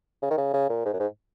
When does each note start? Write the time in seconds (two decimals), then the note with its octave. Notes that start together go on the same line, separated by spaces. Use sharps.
0.22 C#3
0.30 D#3
0.37 C#3
0.53 C#3
0.69 A#2
0.85 G#2
0.93 F#2
1.00 G#2